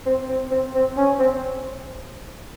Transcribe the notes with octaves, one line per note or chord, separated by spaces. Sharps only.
C4
C4
C4
C4
C#4
C4